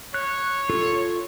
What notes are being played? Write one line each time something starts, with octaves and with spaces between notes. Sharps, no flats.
C#5 F#6
F4 A4